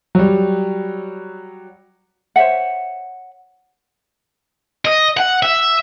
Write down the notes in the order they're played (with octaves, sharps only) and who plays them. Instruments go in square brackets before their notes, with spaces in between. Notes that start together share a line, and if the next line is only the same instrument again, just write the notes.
[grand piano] F#3 G3
[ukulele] C5 C#5 E5 F#5
[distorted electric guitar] D#5
F#5
E5